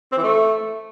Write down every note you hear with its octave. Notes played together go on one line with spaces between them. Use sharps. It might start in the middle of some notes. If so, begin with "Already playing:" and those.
C4
E3
A3